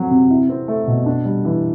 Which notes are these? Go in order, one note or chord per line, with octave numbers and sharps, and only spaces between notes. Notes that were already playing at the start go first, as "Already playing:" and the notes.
Already playing: F#3 C4
C3
E4
C4
A3
B2
D4
G3
E3